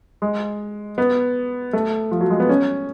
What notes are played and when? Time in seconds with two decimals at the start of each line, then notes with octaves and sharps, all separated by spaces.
0.22 G#3
0.98 B3
1.73 A3
2.11 F3
2.21 F#3
2.30 G#3
2.40 B3
2.49 C#4